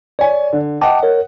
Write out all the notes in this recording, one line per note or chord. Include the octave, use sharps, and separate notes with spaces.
C#5 D5 G#5
D3
D#5 F#5 G5 A5 D6
A#4 C#5